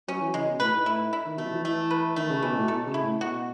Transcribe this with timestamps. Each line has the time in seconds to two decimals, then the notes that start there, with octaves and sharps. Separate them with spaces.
0.08 F#3 C#4
0.21 E3
0.34 C#3 G#3
0.47 B2
0.60 A2 B4
0.73 G#2
0.85 A2 E4
1.13 E4
1.26 D#3
1.38 B2 A3
1.45 F#3
1.52 E3
1.64 E3 A3
1.91 B4
2.16 D#3 A3
2.30 C#3
2.42 B2 E3
2.55 A2
2.68 B2 A4
2.86 C#3
2.94 E4
3.03 A2
3.21 B2 F#4